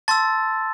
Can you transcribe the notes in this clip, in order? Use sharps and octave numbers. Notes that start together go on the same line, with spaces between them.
A5 C6 E6 A6